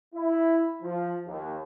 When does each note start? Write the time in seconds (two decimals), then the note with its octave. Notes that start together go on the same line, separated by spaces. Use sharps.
0.14 E4
0.82 F3
1.27 D#2